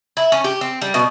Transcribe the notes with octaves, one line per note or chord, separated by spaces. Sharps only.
E4
C#4
G4
C4
G3
B2